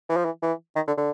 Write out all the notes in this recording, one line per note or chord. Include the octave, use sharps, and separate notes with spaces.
E3
F3
E3
E3
D#3
D3
D3